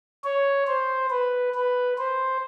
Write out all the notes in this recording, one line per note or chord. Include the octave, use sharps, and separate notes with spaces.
C#5
C5
B4
B4
C5